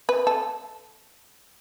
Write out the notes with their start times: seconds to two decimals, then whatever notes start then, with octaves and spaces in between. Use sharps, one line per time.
0.09 B4
0.27 A4